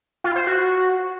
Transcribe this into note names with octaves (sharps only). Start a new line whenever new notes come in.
F4
C5
F#4